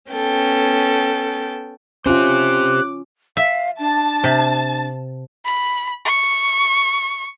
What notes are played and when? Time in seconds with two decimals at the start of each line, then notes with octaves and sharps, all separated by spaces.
0.10 B3 C#4 A4 G5
2.06 C#4 F4 G4 C5 D6 F#6
3.37 E5 F5
3.79 D4 A5 A6
4.24 C3
5.45 B5
6.05 C#6